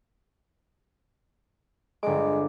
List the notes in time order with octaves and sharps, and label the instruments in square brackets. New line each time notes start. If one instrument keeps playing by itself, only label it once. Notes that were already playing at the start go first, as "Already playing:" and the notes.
[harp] G1 D6 [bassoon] G#3